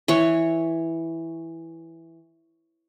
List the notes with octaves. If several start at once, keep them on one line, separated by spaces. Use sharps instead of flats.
E3 C#5